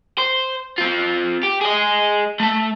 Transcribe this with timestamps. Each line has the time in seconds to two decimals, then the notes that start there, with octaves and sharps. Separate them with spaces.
0.18 C5
0.78 C4 F4
1.43 G4
1.61 G#4 D#5
2.40 A3 A5